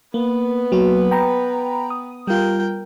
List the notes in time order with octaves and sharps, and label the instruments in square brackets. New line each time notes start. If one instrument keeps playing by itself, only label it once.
[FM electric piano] A#3 [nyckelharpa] B3 B4
[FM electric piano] F#3 A#3 F#4
G5 A#5 B5
D#6
[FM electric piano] G3 F4 [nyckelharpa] A#4 G5